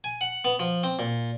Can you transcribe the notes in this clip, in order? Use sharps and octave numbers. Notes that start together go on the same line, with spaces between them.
G#5
F#5
B3
F3
C4
A#2